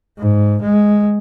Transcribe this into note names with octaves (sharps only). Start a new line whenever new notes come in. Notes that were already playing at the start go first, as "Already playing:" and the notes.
G#2
G#3